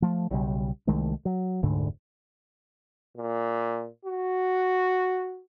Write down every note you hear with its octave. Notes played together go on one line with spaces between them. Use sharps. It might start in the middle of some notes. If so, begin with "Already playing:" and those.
F3 A3
B1 C#3 G3
C2 D#3 G#3 A3
F#3
F1 D2 G#2 D3
A#2
F#4